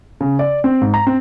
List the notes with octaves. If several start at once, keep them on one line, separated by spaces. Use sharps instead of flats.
C#3
D5
C4
G#2
A#5
C4